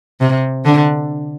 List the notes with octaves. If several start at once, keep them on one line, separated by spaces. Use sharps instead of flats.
C3
D3